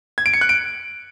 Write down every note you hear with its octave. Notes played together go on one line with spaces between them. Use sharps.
G#6
D7
C#7
F#6
D7